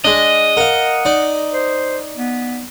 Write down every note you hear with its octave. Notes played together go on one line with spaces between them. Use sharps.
G#3 D4 D#5
A#4 F5 F#5
D#4 D5
C5
B3